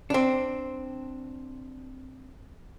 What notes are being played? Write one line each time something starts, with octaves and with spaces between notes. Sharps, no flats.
C4 D4